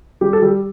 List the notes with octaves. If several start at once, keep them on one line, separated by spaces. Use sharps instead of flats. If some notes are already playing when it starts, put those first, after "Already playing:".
G3 G4
A4
G3 G4